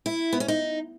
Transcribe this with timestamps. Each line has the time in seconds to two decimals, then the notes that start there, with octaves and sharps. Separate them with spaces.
0.06 E4
0.33 B3
0.40 C#4
0.48 D#4